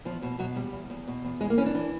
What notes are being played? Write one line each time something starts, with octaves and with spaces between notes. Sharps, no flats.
E2 F3
B2
B2 F#3
E2 G3
E2
E2
B2
E2
E3 G#3
A#3
E3 C#4
D4
E3